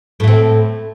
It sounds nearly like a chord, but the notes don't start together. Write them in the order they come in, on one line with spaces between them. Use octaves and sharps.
A2 A3 C4